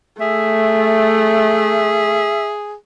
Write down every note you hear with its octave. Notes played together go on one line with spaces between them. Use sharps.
A3 G#4 E5